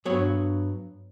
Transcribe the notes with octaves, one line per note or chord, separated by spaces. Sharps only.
G2 F#3 B3 C#5